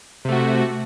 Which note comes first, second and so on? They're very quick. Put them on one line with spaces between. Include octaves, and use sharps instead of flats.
C3 A3 F#4